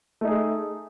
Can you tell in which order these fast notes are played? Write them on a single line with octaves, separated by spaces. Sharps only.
A3 D#4 G#4